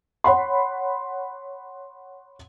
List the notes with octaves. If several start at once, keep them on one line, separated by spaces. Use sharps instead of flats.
C#5 F#5 B5 C6